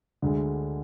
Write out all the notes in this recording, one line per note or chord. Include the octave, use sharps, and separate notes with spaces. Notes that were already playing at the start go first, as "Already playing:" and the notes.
D2 D3 G#3